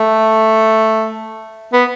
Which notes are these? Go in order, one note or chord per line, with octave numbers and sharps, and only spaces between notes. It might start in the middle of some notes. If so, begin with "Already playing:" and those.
Already playing: A3
B3